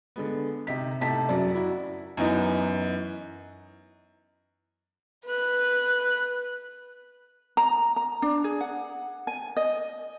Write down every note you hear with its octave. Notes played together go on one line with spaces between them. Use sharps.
D3 G#3 B3
C3 D#4 B6
A2 C3 D#4 A5 B6
F#2 C#3 F#3 D5
E4 F#4
F#2 E3 B3 D#4
B4 F#6
A#5
A#5
D4
G#4
F#5
G#5
D#5